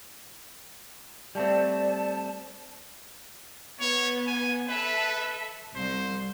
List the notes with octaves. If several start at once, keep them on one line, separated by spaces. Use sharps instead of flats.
G3 A3 C4 D5 A5
B3 C#5
G#5
A4 B4 E5
C2 C5